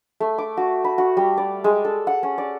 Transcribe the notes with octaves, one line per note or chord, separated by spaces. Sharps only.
A3
D6
F#4
B5
F#4
G3
D5
G#3
A4
F#5
C#4
D5